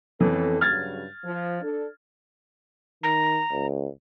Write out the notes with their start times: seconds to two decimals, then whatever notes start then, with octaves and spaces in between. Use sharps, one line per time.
0.20 F2 E3 B3 C#4 A4
0.61 G2 C#3 F#3 F6 G#6 A6
1.24 F3
1.62 D4 A4
3.03 D#3 A#5
3.52 C#2